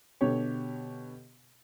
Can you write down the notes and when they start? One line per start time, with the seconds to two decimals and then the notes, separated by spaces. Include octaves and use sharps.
0.21 B2 D3 G4 C#5